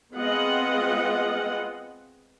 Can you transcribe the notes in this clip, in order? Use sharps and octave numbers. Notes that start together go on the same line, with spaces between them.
G#3 B3 C4 F4 D#5 F#5